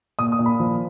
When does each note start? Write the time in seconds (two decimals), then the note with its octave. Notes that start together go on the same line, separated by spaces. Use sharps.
0.19 A#2 D#6
0.32 D#6
0.39 A#2
0.46 B5
0.60 F3